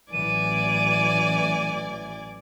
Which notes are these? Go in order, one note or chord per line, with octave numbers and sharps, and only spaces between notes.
A1 E3 F#3 D5 G#5 D#7